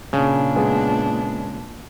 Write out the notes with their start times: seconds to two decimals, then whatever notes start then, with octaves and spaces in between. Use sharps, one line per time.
0.13 A#2 C#3 D4
0.56 G#3 B3 G#4